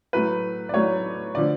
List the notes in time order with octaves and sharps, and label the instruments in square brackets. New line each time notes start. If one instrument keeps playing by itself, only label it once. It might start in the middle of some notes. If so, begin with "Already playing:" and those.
[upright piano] A2 F#3 A3 B4
D5
A2 F#3 A3 C#5
D3 F3 D5